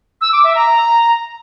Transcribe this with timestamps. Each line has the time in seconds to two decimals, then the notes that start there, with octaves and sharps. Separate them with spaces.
0.21 E6
0.32 D6
0.44 E5
0.55 A#5